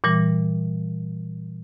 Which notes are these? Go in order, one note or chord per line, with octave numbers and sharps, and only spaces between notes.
A#2 E3 G3